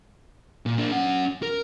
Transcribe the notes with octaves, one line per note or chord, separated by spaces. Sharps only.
A#2
A#3 D4
C#4 F#5
A#4